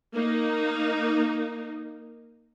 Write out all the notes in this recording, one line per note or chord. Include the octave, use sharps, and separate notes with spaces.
A#3 D#4